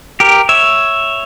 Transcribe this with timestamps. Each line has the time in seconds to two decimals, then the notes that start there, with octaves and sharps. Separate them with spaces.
0.20 G4 A#4
0.49 C#5 E5